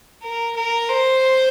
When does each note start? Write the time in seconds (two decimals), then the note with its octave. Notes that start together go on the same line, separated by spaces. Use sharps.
0.22 A#4
0.56 A#4
0.89 C5